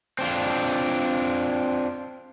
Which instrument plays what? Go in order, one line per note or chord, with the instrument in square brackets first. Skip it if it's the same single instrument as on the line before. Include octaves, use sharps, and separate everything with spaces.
[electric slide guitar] C4 D4 F4